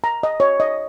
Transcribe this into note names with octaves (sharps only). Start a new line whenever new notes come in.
A#5
D#5
C#5
D#5